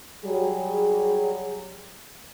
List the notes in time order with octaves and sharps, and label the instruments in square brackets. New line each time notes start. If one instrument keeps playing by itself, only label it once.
[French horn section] F#3 G3 G#4